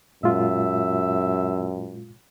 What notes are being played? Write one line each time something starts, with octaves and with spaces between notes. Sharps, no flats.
F#2 A#2 G#3 F4 E5